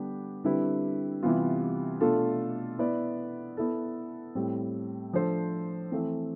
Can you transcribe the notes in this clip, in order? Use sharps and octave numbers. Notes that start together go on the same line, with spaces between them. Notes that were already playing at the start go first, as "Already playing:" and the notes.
Already playing: D3 G3 B3 D4 G4
D3 G3 C4 E4 B4
C3 E3 G3 B3 F4
B2 A3 D4 F4 A4
B3 E4 B4 D5
B3 E4 A4
A2 G3 C4
F3 A3 D4 A4 C5
E3 A3 C4